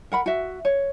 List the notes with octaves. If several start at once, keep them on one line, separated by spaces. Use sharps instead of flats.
A#4 F#5 B5
F#4 E5
C#5